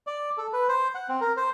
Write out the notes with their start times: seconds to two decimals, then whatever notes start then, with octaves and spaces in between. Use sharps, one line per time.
0.07 D5
0.38 A4
0.53 B4
0.69 C5
0.95 F#5
1.09 C4
1.21 A#4
1.37 C5